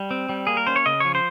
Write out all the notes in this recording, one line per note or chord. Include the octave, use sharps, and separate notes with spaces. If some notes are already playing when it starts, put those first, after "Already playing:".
Already playing: G3
C4
G3
A#3 G#4
A#4
C#4 C5
C#5
C#3 D#5
F3 C#5
C5